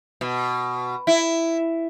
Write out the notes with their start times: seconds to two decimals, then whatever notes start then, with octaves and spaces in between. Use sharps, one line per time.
0.21 B2
1.07 E4